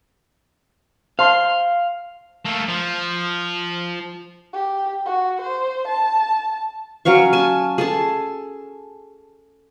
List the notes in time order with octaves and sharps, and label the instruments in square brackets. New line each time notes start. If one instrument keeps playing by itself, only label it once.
[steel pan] C5 A5 C6 [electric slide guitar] F5
[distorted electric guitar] A3 A#3
F3
[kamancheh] G4
F#4
C5
A5
[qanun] F#3 C#4 F5 C#6
G#5 A5
G#4 A4 A5